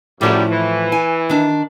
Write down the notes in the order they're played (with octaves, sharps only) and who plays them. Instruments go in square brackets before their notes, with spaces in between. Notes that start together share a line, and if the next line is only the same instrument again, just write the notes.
[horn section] F#2 G3 [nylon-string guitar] A2 F3 A3
[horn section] E3
[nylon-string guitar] G#5
D#3 D4